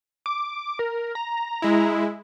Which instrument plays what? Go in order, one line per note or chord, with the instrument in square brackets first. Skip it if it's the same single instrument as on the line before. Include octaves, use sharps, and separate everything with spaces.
[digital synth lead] D6
A#4
A#5
[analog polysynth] G#3 E4